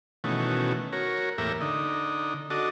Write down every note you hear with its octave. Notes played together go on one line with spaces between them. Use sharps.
B2 D#3 E3 A3 C#4 F#4
F#4 A#4 C#5
E2 A2 A#3 G4 A#4 E5
D3 D#4
D4 F#4 A4 D#5